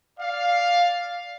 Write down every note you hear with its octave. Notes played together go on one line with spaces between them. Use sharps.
D5 F5